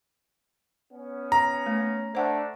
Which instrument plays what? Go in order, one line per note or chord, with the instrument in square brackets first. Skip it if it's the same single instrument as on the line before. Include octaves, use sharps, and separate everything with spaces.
[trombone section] B3 C#4
[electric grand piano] A#5
[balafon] A3
[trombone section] A3 D4 [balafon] C5 F#5